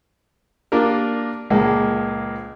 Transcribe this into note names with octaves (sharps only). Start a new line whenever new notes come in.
A#3 D4 F4 G4 A#4
C#2 A#2 F3 G#3 A#3